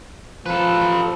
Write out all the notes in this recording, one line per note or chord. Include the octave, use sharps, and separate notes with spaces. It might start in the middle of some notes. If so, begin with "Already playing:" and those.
F3 A4 B4